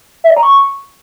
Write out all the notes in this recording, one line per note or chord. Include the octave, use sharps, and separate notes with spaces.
E5
D5
A#5
C#6